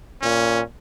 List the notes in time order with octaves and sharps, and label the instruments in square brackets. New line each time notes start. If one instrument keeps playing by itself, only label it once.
[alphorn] A#2 [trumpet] C#4